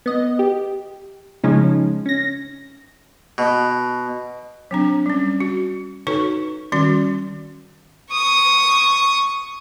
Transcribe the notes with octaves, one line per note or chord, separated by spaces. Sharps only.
B3 D#5
G4
C#3 F3 G#3 C#4 D#4
C#4 A#6
B2
F#3 C4 D4
G3 C#4
F#4
D#4 F#4 A4 B4 C#5 C#6
D#3 G3 C#4 F#4 C6
C#6 D#6